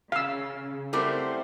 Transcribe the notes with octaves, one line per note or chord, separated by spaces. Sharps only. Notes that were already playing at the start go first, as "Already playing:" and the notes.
C#3 G#4 F5 E6
F#3 G3 A3 C4 E4 A#4 C5